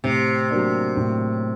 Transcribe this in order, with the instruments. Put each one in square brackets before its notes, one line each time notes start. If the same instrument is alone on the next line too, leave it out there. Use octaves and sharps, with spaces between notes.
[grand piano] A2 [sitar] C3
[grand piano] F#3 A#3 D4
A2